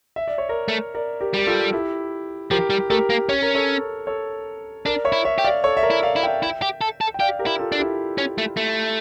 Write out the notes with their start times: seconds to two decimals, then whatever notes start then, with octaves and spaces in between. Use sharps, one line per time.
0.16 E5
0.28 D5
0.38 C#5
0.49 A#4 D5
0.68 A3
0.95 A#4 D5
1.20 G4 A#4
1.34 G3 G4
1.47 F4 A4
1.73 E4 G4
2.51 F3 G4 A#4
2.70 G3
2.90 A3 G4 A#4
3.10 A#3
3.29 C#4 C#5
3.42 A#4
3.55 A4 C#5
4.07 A4 C#5
4.86 D4 A#4 D5
5.05 C#5 E5
5.12 E4
5.25 C#5 E5
5.38 G4
5.44 D5 F5
5.64 A4 C#5
5.77 E5
5.83 A#4 D5
5.90 E4
6.03 D5 F5
6.16 E4
6.23 E5 G5
6.43 E4
6.62 G4
6.81 A4
7.01 A4
7.14 G5
7.20 G4 D5 F5
7.39 G4 A#4
7.46 E4
7.59 F4 A4
7.72 D4
7.79 E4 G4
8.18 C#4
8.38 A3
8.57 A3